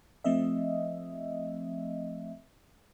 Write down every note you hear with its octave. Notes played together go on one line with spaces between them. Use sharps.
F3 A3 C4 D#5 E5